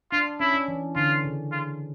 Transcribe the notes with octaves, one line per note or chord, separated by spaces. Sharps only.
D4 F4
C#4 E4
C#4
E3
D3 F4
C#3
F4